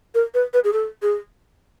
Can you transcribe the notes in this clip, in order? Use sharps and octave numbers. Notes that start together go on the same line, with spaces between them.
A#4
B4
B4
G#4
A4
G#4